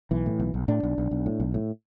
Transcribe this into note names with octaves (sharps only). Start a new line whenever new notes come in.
B1 E3
A2
B1
B1
A2 D4
B1
B1
B1
A2
B1
A2